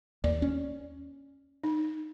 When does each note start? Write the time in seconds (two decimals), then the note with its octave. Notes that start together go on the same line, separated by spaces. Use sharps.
0.24 D#2 D5
0.42 C#4
1.64 D#4